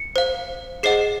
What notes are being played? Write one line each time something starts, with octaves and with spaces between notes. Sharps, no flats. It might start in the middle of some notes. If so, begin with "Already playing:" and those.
Already playing: C#7
C5 F5
G#4 C5 D#5 F#5 C7